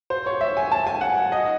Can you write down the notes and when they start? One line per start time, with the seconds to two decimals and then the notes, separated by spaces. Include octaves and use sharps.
0.10 C5
0.26 C#5
0.41 E5
0.57 G#5
0.72 A5
0.87 G#5
1.01 F#5
1.32 D#5